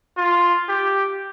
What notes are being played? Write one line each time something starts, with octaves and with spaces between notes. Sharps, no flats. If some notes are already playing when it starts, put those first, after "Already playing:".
F4
G4